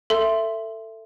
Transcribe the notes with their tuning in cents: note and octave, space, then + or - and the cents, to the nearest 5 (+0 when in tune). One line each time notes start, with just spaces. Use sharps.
A4 +20 E5 +10 C6 +0